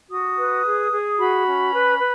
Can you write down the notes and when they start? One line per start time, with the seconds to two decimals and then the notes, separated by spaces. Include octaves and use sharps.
0.10 F#4 D#6
0.38 B4
0.65 G#4
0.91 G#4
1.18 F#4 B5
1.46 C#4
1.72 B4
1.99 B4